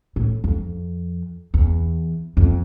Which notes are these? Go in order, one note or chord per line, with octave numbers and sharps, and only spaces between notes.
A2
F2
E2
F2